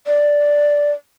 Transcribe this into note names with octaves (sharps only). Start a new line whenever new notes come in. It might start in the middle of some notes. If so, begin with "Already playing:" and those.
D5